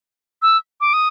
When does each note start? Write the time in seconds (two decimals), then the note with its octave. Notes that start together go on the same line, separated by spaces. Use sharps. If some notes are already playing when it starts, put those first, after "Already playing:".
0.42 E6
0.81 D6
0.93 D#6